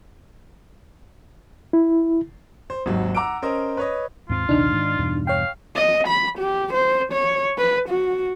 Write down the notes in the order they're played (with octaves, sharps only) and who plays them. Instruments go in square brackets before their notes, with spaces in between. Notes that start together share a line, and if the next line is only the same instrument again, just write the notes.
[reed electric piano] E4
[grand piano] C5
G#1 D#2 F#3
F#5 A#5 D6 E6 D7
C#4 A#4 C5 D#5
B4 C#5 D#5
[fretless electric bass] D#2 G#2 C4 [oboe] F4
[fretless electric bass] A#1 D#2 C3 [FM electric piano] D4 D#4 F6
[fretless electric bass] G#2 D#3
E2 G2 B2
[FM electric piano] C#5 G5 [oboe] F5
[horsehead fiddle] D#5
B5
G4
C5
C#5
B4
F#4